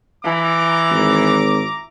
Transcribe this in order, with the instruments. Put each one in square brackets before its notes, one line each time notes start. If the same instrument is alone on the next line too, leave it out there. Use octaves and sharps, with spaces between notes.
[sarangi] E3 [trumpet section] A#5 D6
[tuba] G#1